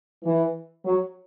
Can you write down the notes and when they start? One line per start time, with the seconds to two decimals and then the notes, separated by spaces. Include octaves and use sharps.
0.24 E3
0.85 F#3